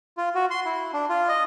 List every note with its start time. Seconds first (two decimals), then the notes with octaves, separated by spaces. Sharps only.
0.17 F4
0.35 F#4
0.50 C6
0.65 E4
0.94 D4
1.09 F4
1.29 D#5